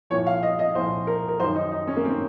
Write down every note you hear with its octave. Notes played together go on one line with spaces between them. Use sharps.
C2 A#2 F3 C#5
F5
D#5
D#5
C2 A#2 F3 C5
A#4
A#4
F#2 D#3 C5
D#4
D#4
C#4
A#3
C4
D#3